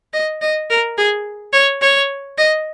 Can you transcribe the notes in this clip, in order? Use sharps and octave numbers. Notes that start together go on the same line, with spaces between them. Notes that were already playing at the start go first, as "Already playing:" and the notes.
D#5
D#5
A#4
G#4
C#5
C#5
D#5